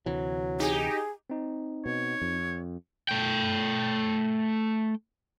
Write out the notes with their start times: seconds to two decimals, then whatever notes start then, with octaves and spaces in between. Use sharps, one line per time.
0.06 D2 C3 E3 F#3
0.60 D#4 G4 G#4
1.30 C4 D#4
1.86 B2 C#5
2.22 F2
3.09 A3 G5